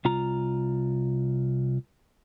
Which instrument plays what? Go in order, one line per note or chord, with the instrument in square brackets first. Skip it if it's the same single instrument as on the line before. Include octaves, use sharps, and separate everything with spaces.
[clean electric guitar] C2 F4 A#5